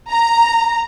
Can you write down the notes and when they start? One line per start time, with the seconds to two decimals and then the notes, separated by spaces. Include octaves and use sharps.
0.10 A#5